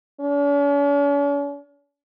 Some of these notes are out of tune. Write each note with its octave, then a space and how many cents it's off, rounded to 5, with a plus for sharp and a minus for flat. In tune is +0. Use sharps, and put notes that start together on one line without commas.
C#4 +45